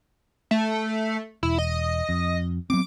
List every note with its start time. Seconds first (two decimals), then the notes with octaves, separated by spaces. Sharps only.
0.51 A3
1.43 E1 E4
1.58 D#5
2.09 F2
2.70 F#3 B3 C4 D6